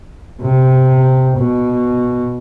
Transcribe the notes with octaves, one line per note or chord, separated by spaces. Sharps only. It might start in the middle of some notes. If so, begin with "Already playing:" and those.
C3
B2